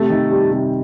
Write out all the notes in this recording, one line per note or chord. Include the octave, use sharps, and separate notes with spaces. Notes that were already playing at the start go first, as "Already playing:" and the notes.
Already playing: C3 A3
D#3
G3
C3